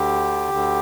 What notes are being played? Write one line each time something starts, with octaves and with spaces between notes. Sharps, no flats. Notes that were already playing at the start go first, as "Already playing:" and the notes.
Already playing: D2 D3 G4
D2 D3